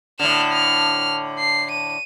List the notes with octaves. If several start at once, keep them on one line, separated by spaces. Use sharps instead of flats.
A2 D3 F6 E7
F6
C7
D#7